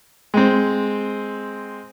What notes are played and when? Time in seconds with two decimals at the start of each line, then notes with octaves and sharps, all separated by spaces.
0.34 G#3 C4